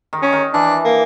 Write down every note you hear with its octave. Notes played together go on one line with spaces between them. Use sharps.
D#3
C#4
D#3
E3 D4
A#3